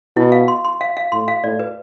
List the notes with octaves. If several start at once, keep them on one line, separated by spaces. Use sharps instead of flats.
B2 E4
F5
C6
C6
F5
F5
A2 C6
F5
A2 D5
B4